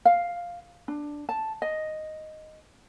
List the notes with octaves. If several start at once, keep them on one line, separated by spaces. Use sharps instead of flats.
F5
D4
A5
D#5